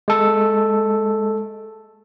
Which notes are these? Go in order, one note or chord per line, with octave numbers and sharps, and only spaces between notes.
G#3 A4